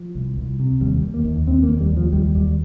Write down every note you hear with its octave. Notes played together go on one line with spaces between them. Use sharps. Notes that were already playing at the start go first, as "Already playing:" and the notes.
Already playing: F3
C2
C2
C3
D#2 G3
D#2
A#3
D#2
D#2 C4
A#3
D#2
G3
D#2
F3
D#2 G3
D#2 G3